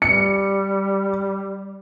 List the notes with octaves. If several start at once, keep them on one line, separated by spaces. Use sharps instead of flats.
G3 C#7